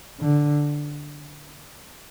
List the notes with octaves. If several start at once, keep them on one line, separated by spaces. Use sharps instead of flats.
D3